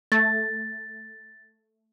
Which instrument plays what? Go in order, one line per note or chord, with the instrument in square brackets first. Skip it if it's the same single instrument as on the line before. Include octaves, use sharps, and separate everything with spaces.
[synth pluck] A3 [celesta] A6